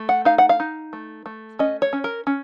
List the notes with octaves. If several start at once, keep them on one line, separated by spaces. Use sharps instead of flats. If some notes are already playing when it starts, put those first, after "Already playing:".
Already playing: A3
F#5
D#4 F5
F#5
F5
D#4
A3
A3
C#4 D#5
C#5
C#4
A#4
C#4